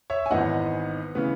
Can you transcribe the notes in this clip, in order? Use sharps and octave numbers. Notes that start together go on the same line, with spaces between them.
C#5 E5
G#5
G#1 G#2 E3 B3 D#4 D#5 F#5
C#3 E3 B3